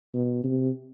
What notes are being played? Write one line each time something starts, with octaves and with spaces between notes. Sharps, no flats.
B2
C3